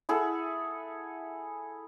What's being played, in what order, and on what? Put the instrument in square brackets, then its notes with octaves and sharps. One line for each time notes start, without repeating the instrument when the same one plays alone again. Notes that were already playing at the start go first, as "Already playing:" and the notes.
[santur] E4 G#4 A4 F#5